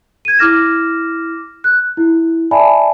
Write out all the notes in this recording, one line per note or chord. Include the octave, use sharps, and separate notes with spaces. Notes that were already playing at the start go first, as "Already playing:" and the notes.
G#6 D#7
E4 D6 F6 A#6 E7
F#6
E4
D5 E5 G#5 A5 B5